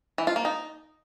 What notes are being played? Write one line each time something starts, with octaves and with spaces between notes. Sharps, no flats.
E3
F4
A#3
D#4